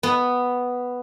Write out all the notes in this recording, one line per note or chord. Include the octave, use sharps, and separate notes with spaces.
B3